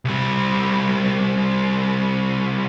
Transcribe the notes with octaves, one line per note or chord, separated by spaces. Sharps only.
C2 G3